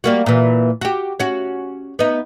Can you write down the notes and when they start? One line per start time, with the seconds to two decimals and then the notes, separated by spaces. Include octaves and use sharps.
0.04 G3 A#3 F#4
0.26 A#2 E3
0.81 F#4 G4
1.20 C#4 F#4
1.99 B3 D#4